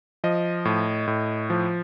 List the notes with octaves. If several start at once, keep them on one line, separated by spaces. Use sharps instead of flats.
F3 D#5
A2
A2
F3